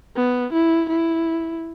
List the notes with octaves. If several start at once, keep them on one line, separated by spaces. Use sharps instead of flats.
B3
E4
E4